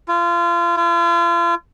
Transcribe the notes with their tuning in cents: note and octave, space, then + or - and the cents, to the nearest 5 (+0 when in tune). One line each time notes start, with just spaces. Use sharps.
F4 -30
F4 -40